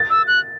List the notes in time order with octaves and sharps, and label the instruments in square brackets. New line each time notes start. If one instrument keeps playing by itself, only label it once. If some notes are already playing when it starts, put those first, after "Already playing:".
Already playing: [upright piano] A6
[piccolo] E6
F#6